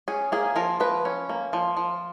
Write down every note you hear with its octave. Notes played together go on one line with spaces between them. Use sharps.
C#4 G#4
A#3 G#4
F3 A#4
F3 B4
C#4
A#3
F3
F3